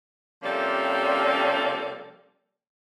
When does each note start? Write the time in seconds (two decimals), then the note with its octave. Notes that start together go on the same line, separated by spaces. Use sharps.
0.43 C3 F3 G3 A#3 C#4 A4